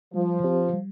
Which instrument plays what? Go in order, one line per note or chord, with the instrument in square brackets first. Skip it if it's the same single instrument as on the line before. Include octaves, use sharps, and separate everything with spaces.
[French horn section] F3 [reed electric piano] G3
[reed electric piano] C4 G4 C5
G3